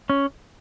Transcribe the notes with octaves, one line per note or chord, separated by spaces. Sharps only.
C#4